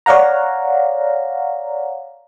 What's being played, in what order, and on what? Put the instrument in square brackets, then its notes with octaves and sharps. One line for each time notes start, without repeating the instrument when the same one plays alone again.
[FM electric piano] C#5 D5 F5 F#5 A#5